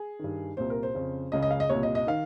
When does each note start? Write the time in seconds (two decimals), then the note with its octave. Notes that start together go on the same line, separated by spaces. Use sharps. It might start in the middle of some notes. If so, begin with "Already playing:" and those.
Already playing: G#4
0.19 G2 D#3
0.57 C2 A#2 C5
0.70 A#4
0.83 C5
0.95 F2 C#3
1.32 C#2 C#3 D#5
1.42 D#5
1.51 F5
1.60 D#5
1.69 C2 A#2 C#5
1.83 D#5
1.95 D#5
2.07 D#3 F5